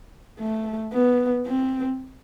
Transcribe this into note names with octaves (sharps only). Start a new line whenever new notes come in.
A3
B3
C4